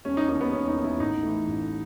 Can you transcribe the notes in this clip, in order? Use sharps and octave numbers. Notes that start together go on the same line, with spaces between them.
E1 C#4
D#4
D#2 D#3 D#4
B3
E1 C#4
D#4
D#2 D#3
E4
A1 D#4
A2 E3
A1